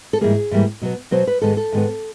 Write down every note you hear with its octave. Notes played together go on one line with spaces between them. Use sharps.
A4
G#2 E3 G3 A#3 G#4
G#2 E3 G3 A#3
B2 F#3 B3
B2 F#3 B3 C5
B4
G#2 D#3 G#3 B3 A4
A4
G#2 D#3 G#3 B3